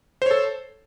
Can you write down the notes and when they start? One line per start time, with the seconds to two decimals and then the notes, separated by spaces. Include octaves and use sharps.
0.22 C5
0.26 C#5
0.31 A4